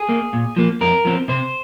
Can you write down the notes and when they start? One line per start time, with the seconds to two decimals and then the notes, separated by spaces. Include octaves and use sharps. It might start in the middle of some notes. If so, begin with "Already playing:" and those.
Already playing: G#4
0.09 A#3
0.33 A#2
0.56 F3 A#3
0.81 F2 A#4
1.05 F3 C4
1.28 C3 C5